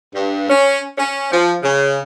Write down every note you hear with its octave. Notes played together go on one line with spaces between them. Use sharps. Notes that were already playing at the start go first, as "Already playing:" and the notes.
G2
C#4
C#4
F3
C#3